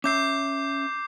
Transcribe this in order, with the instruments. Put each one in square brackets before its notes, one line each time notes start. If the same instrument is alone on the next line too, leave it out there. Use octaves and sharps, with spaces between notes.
[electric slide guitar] C#4 E5 [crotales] D6 G6 C7